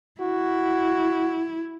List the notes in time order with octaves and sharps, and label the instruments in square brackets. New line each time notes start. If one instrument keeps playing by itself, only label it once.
[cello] E4 [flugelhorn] F#4